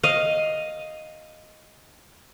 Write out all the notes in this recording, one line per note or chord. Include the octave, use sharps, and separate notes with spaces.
D#5 F5